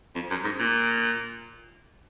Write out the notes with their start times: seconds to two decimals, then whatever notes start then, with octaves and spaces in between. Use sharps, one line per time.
0.15 F2
0.31 F#2
0.44 G#2
0.60 A#2